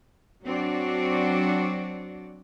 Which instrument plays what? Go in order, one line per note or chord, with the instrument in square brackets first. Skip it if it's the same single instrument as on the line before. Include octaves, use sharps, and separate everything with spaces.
[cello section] F#3 C4 D4 F#4 D5